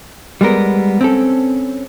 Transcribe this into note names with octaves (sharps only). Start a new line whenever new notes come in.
G3 G#3 B3 A#4
C4 C#4 A4